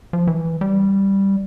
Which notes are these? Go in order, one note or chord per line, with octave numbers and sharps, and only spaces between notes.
F3
E3
G3